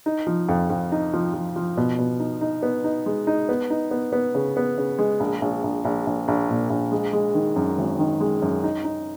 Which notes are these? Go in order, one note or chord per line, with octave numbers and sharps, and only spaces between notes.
D#4
F3
F2
F2
D#4
F3
F3
F3
B2
B2
D#4
D#4
B3
D#4
G#3
D#4
B3
D#4
B3
B3
C#3
B3
C#3
G#3
A#1
A#1
A#1
A#1
A#1
A#1
A#2
A#1
G#3
G#3
D#3
F#2
G#1
D#3
G#3
F#2
D#4
D#4